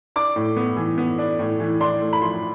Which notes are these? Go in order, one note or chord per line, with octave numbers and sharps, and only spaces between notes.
D4 D6
A2
B3
E3
B3
D4
A2
E3
D4 C6
A3
B5
F3 C6